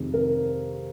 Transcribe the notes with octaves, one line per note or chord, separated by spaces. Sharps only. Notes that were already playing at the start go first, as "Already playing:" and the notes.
Already playing: F2 C3 D#3 G#3
A#4